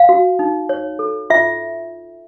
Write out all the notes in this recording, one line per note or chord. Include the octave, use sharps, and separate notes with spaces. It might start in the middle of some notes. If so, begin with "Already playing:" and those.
Already playing: F5
F#4
D#4
C#5
A4
F4 E5